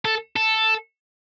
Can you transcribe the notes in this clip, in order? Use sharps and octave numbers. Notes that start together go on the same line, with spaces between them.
A4
A4